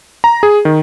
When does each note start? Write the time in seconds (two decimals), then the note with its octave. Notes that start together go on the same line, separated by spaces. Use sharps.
0.24 A#5
0.43 G#4
0.65 D#3